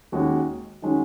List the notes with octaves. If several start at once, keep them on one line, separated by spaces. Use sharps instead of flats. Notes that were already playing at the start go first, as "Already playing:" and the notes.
D#2 D#3 G#3 C#4 F#4
D#3 G#3 C#4 F#4